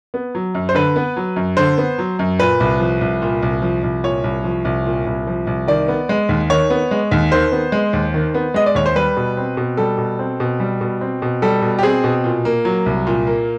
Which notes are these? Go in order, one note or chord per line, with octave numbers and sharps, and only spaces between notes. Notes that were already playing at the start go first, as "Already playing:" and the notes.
B3
F#3
F#2
C5
D3 B4
B3
F#3
F#2
D3 C5
B3
F#3
F#2
A#2 B4
C2
F3
C2
A#2
C2
F3
C2
A#2 C#5
C2
F3
C2
A#2
C2
F3
C2
D#3 D5
B3
G#3
D#2
D#3 C#5
B3
G#3
D#2
D#3 C5
B3
G#3
D#2
D#3
B3
G#3 D#5
D5
D#2 C#5
C5
G3 B4
B2
C4
B2
G3 A4
B2
C4
B2
G3
B2
C4
B2
G3 A4
B2
G4
C4 G#4
B2
A#2
A#3
F#3
C2
A#2
A#3